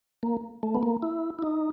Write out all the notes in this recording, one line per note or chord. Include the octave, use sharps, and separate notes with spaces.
A#3
A3
B3
A#3
E4
E4
D#4